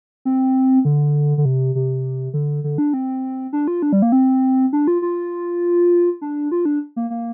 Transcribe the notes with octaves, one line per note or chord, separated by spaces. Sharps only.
C4
D3
D3
C3
C3
D3
D3
D4
C4
D4
F4
D4
G3
A#3
C4
D4
F4
F4
D4
F4
D4
A#3
A#3